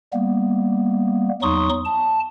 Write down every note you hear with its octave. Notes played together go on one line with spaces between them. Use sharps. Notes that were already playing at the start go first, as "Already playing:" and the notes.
G3 A#3 B3
E2 F#3 D#4 C6 C#6 D#6
A5